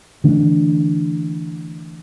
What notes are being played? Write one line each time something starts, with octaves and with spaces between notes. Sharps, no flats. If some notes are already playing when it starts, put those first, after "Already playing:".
D3 E3 A3 D4